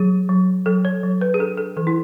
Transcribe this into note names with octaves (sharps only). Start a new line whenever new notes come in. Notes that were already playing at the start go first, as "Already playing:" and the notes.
Already playing: F#3 G#4
F#3
F#3 A4
C#5
F#3
B4
G#4
D4 A4
A4
E3 A4
E4